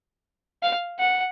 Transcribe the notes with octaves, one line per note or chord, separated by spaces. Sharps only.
F5
F#5